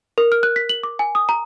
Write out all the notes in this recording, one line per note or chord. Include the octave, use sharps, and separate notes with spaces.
A#4
F6
F#6
B6
F#7
D6
G#5
D#6
A#5